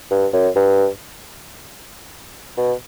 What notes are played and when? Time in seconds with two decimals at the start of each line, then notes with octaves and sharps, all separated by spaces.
0.11 G2
0.33 F#2
0.56 G2
2.57 B2